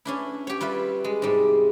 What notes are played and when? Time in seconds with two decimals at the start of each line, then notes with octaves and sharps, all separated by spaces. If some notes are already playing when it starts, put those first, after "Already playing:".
0.05 C#4 D4 E4
0.47 G4 C#5
0.61 G3 F4 B4 E5
1.04 G#3
1.22 G#2 C3 G3 G#3